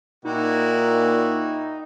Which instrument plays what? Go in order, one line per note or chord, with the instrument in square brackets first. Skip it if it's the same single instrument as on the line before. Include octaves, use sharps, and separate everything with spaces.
[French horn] A#2 [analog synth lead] D#4 [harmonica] E4 F#4 G4